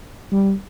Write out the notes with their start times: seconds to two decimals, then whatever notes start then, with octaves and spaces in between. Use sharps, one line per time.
0.32 G3